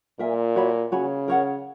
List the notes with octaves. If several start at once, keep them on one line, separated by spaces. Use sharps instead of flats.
A#2 A#4 E5 G#5
F#4 C#5 E5 B5
C#3 F#4 C#5 G#5 B5
A#4 C#5 F#5